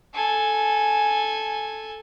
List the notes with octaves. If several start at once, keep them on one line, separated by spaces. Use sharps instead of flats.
A4 G#5